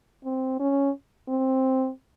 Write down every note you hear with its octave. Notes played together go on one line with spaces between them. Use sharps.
C4
C#4
C4